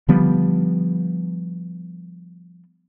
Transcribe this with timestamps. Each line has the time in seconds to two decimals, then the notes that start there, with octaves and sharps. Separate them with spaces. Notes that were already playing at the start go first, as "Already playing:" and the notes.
0.08 D3 F3 G3 B3